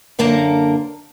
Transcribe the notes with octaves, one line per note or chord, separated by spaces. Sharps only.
F#2 D3 A#3 A#4 A5